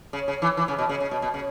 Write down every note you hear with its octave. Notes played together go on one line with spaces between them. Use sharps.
C#3
C#3
E3
E3
C#3
B2
C#3
C#3
B2
B2
C#3